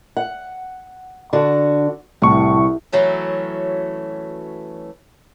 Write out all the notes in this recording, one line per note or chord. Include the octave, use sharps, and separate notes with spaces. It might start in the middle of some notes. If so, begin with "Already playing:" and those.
F#5
D3 D4 F#4
C2 A2 C#6
E3 F#3 A3 C#4